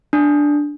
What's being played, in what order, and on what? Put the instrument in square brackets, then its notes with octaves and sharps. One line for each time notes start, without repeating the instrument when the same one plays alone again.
[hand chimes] D4